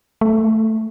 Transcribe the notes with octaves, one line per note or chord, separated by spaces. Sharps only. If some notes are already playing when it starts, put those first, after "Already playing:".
A3